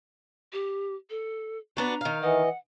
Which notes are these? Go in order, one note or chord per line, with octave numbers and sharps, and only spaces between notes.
G4
A4
B3 D4 F#4 A#5
D#3 F5
E3 D#5 F#5